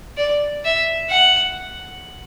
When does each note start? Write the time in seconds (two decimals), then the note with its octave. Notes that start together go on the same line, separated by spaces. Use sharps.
0.17 D5
0.64 E5
1.10 F#5